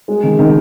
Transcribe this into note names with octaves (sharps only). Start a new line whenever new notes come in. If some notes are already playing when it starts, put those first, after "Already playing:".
G#3
D#3
D#3